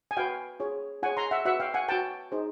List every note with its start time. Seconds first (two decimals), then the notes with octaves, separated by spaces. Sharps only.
0.11 G#5
0.17 F#4 B4 F5 G5
0.60 F4 G#4 C#5
1.03 F4 G#4 C#5 F#5 G#5
1.17 A#5 C6
1.31 E5 F#5
1.45 F#4 B4 E5 F#5
1.60 F5 G5
1.74 F#5 G#5
1.88 F#4 B4 G5 A5
2.32 D#4 G#4 C5